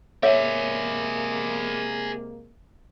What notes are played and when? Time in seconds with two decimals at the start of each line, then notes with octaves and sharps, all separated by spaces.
0.23 C3 G#3 A#3 G#4 C#5 D5 E5